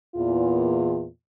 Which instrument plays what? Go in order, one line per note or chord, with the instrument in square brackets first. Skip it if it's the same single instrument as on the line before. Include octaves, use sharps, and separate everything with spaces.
[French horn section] E2 A#2 F4